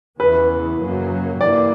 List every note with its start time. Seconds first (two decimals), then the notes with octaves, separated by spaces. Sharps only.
0.19 E2 C#3 E3 B3 B4
0.80 F#2 C#3 F#3 A#3
1.40 G2 E3 A#3 D5